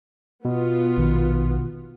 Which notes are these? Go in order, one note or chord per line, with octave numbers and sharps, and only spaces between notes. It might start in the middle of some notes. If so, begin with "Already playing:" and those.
B2 B3 F4
A#1 D#3